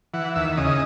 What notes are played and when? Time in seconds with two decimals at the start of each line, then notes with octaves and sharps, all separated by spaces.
0.13 E3 F#5
0.36 D#2 E5
0.57 C#3 D#5